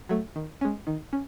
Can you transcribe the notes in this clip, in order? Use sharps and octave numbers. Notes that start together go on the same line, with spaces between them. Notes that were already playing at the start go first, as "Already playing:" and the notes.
F#3 A3
D#3
G#3 C#4
D#3
C#4